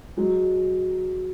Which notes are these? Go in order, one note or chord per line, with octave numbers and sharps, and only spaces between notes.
F#3 G#3